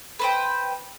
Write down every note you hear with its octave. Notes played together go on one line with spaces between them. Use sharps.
B4 C5 G5